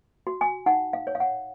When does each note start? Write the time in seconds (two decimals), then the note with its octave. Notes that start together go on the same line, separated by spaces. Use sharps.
0.27 F#4
0.41 G#5
0.66 D#4 F#5
0.93 F5
1.07 C#5
1.15 F5
1.20 F#5